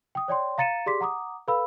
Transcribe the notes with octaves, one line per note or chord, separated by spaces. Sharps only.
G5 D#6
C#5 D5 G5 C6
F5 A#5 A6 C#7 D#7 E7
G4 G#4 D5 C6 D6 B6
F#5 A#5 D6 D#6
A4 B4 F5 B5 E6